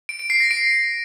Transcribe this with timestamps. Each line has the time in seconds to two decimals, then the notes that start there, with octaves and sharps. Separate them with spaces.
0.09 D7
0.19 D7
0.30 C7
0.40 A#6
0.51 D7